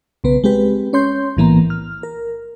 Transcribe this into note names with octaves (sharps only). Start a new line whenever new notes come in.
B1 C#3 B3 B4
G#3 C4 G4 B4
C#4 C#5 C6 G6
B1 A2 E3 A#3 B3 A#5
F6
A#4